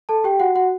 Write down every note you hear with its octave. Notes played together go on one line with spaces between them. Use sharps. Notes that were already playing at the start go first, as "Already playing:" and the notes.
A4 A5
G4 G5
F#4 F#5
F#4 F#5